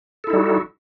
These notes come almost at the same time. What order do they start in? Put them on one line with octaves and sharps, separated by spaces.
A4 E4 D#4 G3 F#4